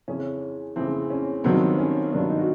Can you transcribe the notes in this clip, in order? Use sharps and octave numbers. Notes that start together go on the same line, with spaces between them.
F2 C#3 E3 C#4
F2 C#3 E3 C4
C#4
G2 D#3 F#3 B3 C4
C#4
G2 D#3 F#3 B3 D4
D#4
F#4